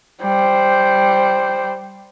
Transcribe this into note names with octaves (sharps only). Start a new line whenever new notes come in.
G3 C5